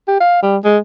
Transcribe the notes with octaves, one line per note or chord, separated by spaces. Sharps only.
G4
F5
G3
G#3